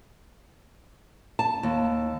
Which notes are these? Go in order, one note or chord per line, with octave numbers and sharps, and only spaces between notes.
A5
D#2